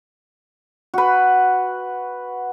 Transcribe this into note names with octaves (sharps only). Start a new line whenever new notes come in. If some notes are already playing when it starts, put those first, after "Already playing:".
F#4 B4